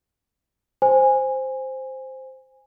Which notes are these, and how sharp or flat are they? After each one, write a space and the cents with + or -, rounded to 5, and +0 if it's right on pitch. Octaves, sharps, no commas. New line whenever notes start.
C5 +0 G#5 -15